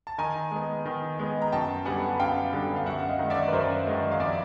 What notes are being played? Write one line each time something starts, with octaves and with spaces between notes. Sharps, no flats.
A5
D#3 G#5 A#5
G#3 B3
D#3
G#3 B3
A#5
F#2 G5 A5
D3 G3 B3 F#5 G#5
F#2 F5 G5
D3 G3 B3
F5
F#2 E5 F#5
D#5 F5
D#3 G#3
D5 E5
B4
F#2 A#4 C5
D#3 G#3
F5
F2 D5 E5